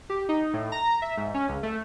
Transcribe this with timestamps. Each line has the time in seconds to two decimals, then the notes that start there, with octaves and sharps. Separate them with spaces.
0.10 G4
0.29 D#4
0.53 A2
0.72 A#5
1.02 E5
1.17 G#2
1.34 C#4
1.48 C#2
1.63 A3